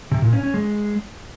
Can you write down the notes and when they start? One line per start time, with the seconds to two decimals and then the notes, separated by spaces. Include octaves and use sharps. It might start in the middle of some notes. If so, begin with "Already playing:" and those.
0.12 C3
0.22 A#2
0.33 C#4
0.43 C#4
0.54 G#3